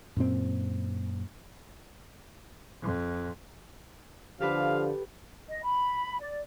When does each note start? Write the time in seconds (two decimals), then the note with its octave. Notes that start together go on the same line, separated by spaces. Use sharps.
0.17 F#2 A#2 C4
2.82 F2
4.41 D3 F3 G4 A4 B4 F5
5.48 D#5
5.63 B5
6.20 D5